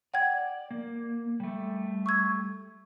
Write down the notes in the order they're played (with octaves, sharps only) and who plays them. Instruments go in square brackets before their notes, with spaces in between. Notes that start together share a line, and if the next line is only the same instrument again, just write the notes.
[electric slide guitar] D5 [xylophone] F#5 G5 G#6
[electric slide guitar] A#3
G3 A3
[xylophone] C#6 E6 G#6